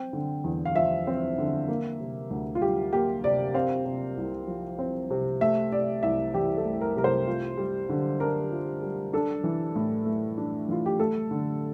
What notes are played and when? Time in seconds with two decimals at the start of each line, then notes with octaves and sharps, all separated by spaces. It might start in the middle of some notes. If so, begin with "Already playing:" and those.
Already playing: C4 G5
0.13 D3
0.44 E2
0.65 F5
0.76 F3 E5
1.07 C4
1.38 D3
1.68 A#3
2.00 C3
2.30 D2
2.55 F4
2.61 G3 G4
2.93 A#3 G4
3.24 C3 D5
3.54 C4 F5
3.86 C3
4.17 C2
4.47 F3
4.79 C4
5.10 C3
5.41 A3 E5
5.72 C3 D5
6.03 C2 E5
6.34 E3 G4
6.57 A4
6.65 A3
6.81 A#4
6.96 C3 A#4
7.04 C5
7.27 F4
7.58 G3
7.89 D3
8.20 D4 A#4
8.51 F4
8.82 G3
9.13 D4 A4
9.44 E3
9.76 A2
10.06 A3
10.37 D4
10.68 E3 F4
10.86 G4
11.00 A3 A4
11.31 D3